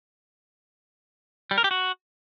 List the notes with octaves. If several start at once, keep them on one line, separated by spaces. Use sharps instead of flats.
G3
A#4
G4
F#4